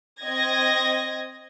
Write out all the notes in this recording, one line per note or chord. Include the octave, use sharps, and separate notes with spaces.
C4 D#5 G#6 A#6